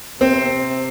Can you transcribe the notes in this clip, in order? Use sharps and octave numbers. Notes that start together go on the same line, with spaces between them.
C3 C4